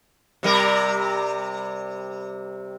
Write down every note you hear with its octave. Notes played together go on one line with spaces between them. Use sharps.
C3 G3 A#4